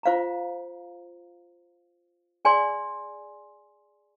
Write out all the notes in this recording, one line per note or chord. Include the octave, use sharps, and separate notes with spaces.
F4 C5 F5 A#5
G#4 D5 G#5 C6